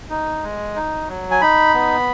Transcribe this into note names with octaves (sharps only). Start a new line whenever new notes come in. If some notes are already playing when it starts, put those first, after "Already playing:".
D#4
G#3
D#4
F#3
G#5
D#4 B5
B3